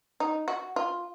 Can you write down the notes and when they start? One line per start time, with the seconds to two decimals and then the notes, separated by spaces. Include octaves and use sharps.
0.20 D#4
0.48 F#4
0.76 F4